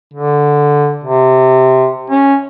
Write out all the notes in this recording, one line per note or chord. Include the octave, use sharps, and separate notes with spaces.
D3
C3
C#4